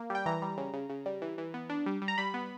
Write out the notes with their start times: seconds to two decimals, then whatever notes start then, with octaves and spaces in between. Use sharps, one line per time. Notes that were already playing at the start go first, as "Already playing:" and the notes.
Already playing: A#3
0.10 G3 G5
0.26 E3 A#5
0.42 G3
0.58 C#3
0.74 C#3
0.90 C#3
1.06 G3
1.22 E3
1.38 E3
1.54 B3
1.70 D4
1.86 G3
2.02 G3
2.08 A#5
2.18 G3 B5
2.34 B3